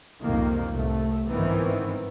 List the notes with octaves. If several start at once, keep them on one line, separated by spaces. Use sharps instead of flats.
C2 F2 G#2 D#3 A#3
C2 A2 A3
G1 G#2 D#3 E3 B3 C4